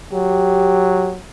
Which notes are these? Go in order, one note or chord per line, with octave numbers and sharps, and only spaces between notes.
F#3 G4